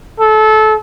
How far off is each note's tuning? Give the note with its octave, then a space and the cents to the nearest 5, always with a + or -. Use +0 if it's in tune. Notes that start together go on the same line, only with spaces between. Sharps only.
A4 -25